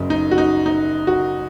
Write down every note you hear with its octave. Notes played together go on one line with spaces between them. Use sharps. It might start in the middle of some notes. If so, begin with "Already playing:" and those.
Already playing: F#1 F#2 C#3
D#4
F#4
D#4
D#4
F#4